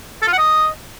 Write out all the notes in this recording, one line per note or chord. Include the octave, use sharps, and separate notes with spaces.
A4
F4
F#5
D#5